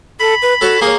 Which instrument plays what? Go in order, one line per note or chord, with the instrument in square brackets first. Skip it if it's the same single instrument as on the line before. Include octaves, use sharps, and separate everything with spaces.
[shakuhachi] A4 [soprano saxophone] B5
[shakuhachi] B4
[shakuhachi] F#4 [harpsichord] A4 C#5 A5
[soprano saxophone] A#3 [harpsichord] G#4 C#5 [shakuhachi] A#4